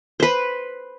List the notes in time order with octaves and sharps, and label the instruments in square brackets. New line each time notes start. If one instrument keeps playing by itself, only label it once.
[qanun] B4 C5